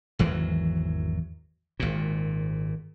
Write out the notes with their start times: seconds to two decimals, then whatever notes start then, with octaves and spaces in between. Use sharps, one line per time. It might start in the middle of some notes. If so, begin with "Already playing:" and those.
0.19 G#1 E2 E3 F#3
1.80 G#1 A#2